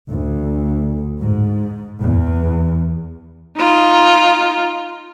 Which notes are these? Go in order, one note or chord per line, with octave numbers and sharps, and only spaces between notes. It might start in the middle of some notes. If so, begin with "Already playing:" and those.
D2
G#2
E2
D#4 F4